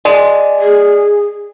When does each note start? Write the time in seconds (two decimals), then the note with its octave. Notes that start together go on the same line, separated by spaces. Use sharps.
0.05 G#3 D5
0.60 G#4